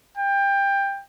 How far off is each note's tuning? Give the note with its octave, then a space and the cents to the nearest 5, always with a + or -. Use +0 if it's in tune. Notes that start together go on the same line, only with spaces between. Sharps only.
G5 +20